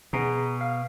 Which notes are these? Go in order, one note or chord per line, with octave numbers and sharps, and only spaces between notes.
B2 G#4 A#5
F5